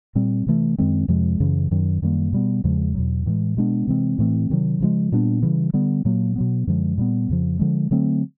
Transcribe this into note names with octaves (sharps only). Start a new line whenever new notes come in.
A#2 G3 C4
C3 E3 A3
F#2 D#3 G#3 C4
F2 C3 F3 G#3
F#2 C#3 E3
F#2 D#3 F#3
F#2 D#3 G3 A#3
B2 G3 B3
E2 C#3 F3 G#3
E2 B2 F#3
A2 E3 G#3
B2 G#3 B3 D4
C3 E3 G#3 C4
A2 E3 A3 C4
C3 D#3 F#3
C#3 F3 G#3
A#2 G3 B3 D4
C#3 E3 G3
D3 G3 B3
A#2 F#3 A#3
B2 F#3 B3
F#2 D3 F3 G#3
A#2 G3 B3
F2 C#3 F3
D3 F3 G#3
D3 F#3 A3 C4